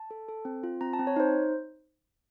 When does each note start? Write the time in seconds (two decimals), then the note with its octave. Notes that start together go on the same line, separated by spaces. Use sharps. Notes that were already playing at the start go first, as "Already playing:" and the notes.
Already playing: A5
0.11 A4
0.29 A4
0.45 C4
0.63 F4
0.81 C4 A#5
0.93 A5
0.99 C4
1.07 C#5
1.16 D#4 C5